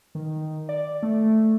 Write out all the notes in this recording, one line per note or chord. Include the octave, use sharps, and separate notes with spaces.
D#3
D5
A3